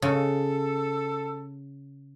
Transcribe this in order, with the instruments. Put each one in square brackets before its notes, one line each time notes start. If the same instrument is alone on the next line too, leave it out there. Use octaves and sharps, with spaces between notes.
[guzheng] C#3 [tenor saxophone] A4